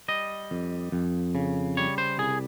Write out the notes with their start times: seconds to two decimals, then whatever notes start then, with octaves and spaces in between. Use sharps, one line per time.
0.08 G3 D#5
0.51 F2
0.92 F2
1.35 C#3
1.77 G3 C#5
1.98 C5
2.18 C2 G#4